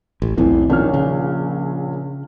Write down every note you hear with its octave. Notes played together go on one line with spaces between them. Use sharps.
A1
B1 E2 A2 E3 C4
A#1 D#3 C#4 F6
C#3